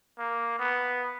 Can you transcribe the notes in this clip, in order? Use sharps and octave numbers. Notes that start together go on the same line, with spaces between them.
A#3
B3